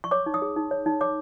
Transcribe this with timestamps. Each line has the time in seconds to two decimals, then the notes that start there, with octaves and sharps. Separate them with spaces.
0.04 C#6
0.11 C#5 D6
0.26 D#4
0.34 D#6
0.42 G#4
0.56 D#4
0.71 C#5
0.86 D#4
1.01 C#5 D6